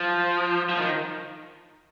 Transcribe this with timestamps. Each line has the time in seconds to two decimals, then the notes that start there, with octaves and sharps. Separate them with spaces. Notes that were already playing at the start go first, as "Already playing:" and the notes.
Already playing: F3
0.69 F3
0.79 D#3